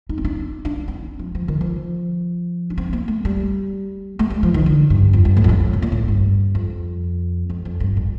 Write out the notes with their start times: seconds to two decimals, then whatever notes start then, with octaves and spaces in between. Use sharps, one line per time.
0.09 D#4
0.18 C4
0.25 D4
0.65 D4
0.88 C4
1.19 F3
1.35 F3
1.48 D#3
1.61 F3
2.70 D4
2.78 C4
2.93 A#3
3.08 A3
3.25 G3
4.19 A3
4.30 G3
4.43 F3
4.54 D#3
4.66 D3
4.90 G2
5.13 F2
5.25 G2
5.37 A2
5.44 F2
5.49 G2
5.60 G2
5.73 C3
5.82 A#2
5.92 A2
6.08 G2
6.55 F2
7.50 F2
7.65 F2
7.80 G2
7.97 A#2